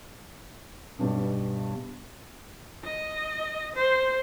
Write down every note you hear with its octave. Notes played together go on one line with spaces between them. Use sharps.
B1 G2 B2 G3
D#5
C5